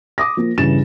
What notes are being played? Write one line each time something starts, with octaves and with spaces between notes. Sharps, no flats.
D6 D#6 A#6
F3 A#3
G2 C#3 E3 A6 E7